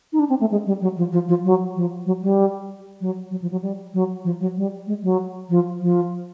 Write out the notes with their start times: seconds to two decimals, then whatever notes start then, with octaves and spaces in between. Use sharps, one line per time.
0.13 D#4
0.19 D4
0.29 C4
0.40 A3
0.51 G#3
0.66 G3
0.81 F#3
0.97 F3
1.12 F3
1.28 F3
1.45 F#3
1.76 F3
2.06 F#3
2.22 G3
3.01 F#3
3.31 F#3
3.42 F3
3.51 F#3
3.62 G3
3.94 F#3
4.24 F3
4.40 F#3
4.57 G3
4.87 G#3
5.03 F#3
5.50 F3
5.81 F3